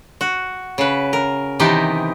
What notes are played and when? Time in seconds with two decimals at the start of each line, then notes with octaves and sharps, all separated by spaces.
0.21 F#4
0.78 C#3 B4
1.13 A#4
1.60 C3 D#3 E3 B3 D#4 G4